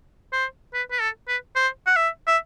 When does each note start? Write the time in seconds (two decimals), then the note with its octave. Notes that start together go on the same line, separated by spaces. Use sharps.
0.33 C5
0.74 B4
0.91 B4
1.01 A4
1.28 B4
1.56 C5
1.87 F#5
1.96 E5
2.27 E5